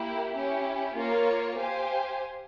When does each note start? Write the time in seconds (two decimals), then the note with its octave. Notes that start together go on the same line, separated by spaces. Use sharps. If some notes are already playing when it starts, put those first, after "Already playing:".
Already playing: A#3 E4 G4
0.35 C#4 E4 G4
0.96 A#3 F4 A#4 C#5
1.57 G4 C5 F5 G#5